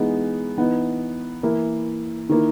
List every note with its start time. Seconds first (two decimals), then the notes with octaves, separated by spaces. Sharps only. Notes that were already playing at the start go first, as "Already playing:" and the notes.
Already playing: E3 G#3 B3 D#4
0.57 E3 B3 D#4
1.43 E3 A#3 E4
2.29 D#3 A#3 E4